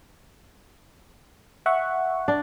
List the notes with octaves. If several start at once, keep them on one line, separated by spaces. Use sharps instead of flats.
E5 F#5 C#6
D4